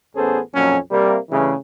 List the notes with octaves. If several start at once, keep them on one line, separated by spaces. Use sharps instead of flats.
A1 B3 C#4 G#4 A4 C5
B1 F2 A#2 F#3 C#4
C3 G3 A#3
G2 C#3 E3 A3 C#4 G#4